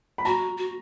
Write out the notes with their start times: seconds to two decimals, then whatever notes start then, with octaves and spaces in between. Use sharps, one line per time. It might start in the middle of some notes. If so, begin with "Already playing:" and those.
0.18 B5
0.25 F#4 A#5
0.58 F#4